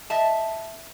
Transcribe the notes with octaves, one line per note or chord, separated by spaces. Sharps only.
D#5 E5 A5